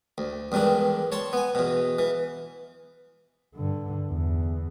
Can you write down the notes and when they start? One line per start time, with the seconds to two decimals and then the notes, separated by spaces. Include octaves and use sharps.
0.18 D2
0.52 E2 G2 D#3 G#3 D4
1.12 C#5 A5 C6
1.33 B3 G#5
1.55 E2 B2
1.99 E3
3.55 G2 D3
4.11 E2